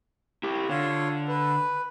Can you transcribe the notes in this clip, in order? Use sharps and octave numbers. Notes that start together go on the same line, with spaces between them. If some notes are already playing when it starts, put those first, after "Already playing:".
E4 G4
D3 F4 C#5
B4